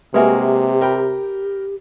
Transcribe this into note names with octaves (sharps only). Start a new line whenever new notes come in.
C3 G#3 A#3 F#4 G4 B4 E5 G#5
A#4 G5 B5